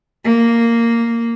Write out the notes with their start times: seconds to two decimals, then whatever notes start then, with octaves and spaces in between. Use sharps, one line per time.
0.24 A#3